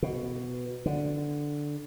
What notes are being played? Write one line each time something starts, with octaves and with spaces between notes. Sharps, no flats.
B2
D3